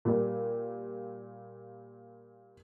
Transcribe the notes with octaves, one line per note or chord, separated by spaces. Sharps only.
A#2 G3